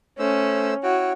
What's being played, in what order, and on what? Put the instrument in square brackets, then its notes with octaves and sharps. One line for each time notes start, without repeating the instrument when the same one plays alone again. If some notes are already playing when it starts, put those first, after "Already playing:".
[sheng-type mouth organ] A3 C5 E6 [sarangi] C#4
[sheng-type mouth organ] E4 C#5 G5 [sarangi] F#4